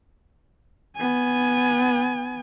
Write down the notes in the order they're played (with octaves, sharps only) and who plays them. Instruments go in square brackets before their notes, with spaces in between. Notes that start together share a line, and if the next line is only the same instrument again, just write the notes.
[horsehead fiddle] B3 G#5